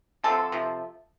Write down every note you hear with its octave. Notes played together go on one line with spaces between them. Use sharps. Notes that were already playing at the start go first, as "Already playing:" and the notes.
D3 F3 A3 C4 A4 A5
C3 F3